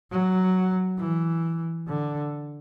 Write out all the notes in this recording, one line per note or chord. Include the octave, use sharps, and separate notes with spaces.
F#3
E3
D3